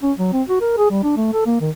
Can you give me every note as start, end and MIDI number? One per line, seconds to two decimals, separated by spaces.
0.02 0.12 61
0.18 0.30 54
0.33 0.42 60
0.49 0.60 66
0.61 0.76 70
0.77 0.89 68
0.91 1.00 55
1.03 1.13 62
1.17 1.30 57
1.33 1.46 69
1.46 1.56 58
1.61 1.70 51